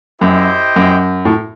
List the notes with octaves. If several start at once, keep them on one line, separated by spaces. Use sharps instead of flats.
F#2 E4 G4 C5 D#5 G5
F#2
A2